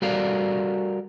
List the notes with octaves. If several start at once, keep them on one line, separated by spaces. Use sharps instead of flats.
G3 F#4 A4 A#4 D5 F5